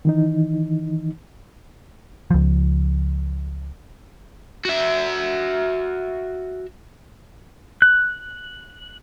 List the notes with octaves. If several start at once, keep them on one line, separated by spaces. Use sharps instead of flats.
D#3 E3 D#4
C#2 F3
F#4 E5
F#6